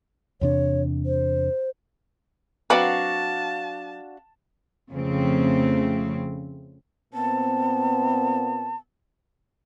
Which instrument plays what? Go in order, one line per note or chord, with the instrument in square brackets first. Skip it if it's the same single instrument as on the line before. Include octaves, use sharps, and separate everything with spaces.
[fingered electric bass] E2 C3 D4 [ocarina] C#5
[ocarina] C5
[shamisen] F#3 C4 B4 [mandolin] D4 F#4 F5 [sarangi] A5
[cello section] F2 C#3 A3 C4
[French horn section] A#2 B3 C4 [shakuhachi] A5